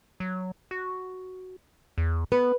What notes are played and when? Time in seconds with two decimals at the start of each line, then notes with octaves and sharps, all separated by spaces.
0.20 F#3
0.71 F#4
1.98 E2
2.32 B3 B4